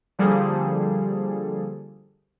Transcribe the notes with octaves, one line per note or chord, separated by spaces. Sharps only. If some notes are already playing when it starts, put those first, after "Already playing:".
D3 F3 G3 A#3 G#4 A4